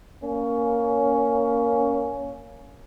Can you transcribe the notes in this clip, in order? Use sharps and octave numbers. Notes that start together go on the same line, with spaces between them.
A#3 C#4